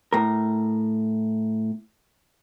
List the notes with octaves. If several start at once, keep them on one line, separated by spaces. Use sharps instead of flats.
A2 A#4